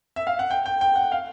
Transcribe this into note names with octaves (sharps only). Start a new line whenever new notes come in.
E5
F5
F#5
G5
G5
G5
F#5
F5